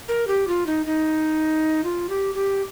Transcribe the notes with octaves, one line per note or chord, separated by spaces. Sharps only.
A#4
G4
F4
D#4
D#4
F4
G4
G4